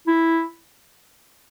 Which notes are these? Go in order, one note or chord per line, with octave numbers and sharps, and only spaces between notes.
E4